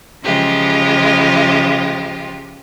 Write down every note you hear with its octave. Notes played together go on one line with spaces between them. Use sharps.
C#3 E3 F3 G#3 F4 G4